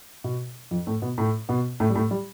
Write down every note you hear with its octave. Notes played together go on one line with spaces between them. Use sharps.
B2
F2 F3
A2 A3
B2 B3
A2 A3
B2 B3
A2 A3
G3
A2 A3
G3